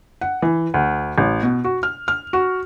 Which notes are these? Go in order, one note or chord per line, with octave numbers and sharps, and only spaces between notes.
F#5
E3
D2
A1
B2
F#4
F6
F6
F#4